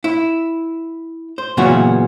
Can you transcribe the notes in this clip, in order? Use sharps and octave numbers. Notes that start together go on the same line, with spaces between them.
E4
C5
F#2 A#2 C#3 E3 B3 F#4